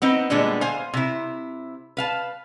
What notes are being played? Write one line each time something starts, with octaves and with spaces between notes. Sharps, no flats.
B3 C4 D#4
A#2 D3 G3 G#3 B3 D4
C5 F5 G#5
C3 E4
B4 F5 A5